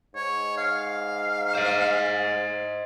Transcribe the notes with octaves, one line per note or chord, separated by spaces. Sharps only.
G#2 C#5
F5
C5 D#5